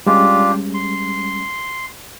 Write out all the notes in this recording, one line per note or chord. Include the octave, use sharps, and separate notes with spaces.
G3 G#3 C#4 D4 F4 G4
C6